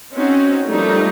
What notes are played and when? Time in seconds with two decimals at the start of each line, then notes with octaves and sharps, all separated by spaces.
0.13 C4 C#4 D#4 F#4
0.69 F3 G3 A3 A#3 D#4